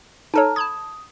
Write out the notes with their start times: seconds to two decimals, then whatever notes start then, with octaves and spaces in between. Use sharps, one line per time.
0.34 D#4 A4 C#5 A5 A#5 F6
0.56 A5 B5 D#6 G#6